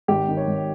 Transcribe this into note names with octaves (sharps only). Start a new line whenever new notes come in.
G#1 G4
D#3
C#5
G#1